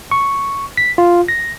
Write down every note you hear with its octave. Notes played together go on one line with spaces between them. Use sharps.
C#6
B6
F4
A#6